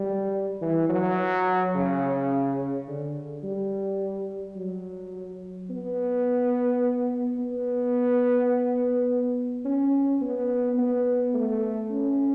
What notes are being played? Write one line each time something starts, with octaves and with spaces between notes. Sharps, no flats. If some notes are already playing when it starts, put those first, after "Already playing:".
Already playing: G3
E3
F#3
C#3
D3
G3
F#3
B3
B3
C#4
B3
B3
A3
C#4